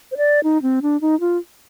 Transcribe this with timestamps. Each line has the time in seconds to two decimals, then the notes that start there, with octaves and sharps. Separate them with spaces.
0.12 C5
0.17 D5
0.44 D#4
0.62 C4
0.82 D4
1.01 D#4
1.20 F4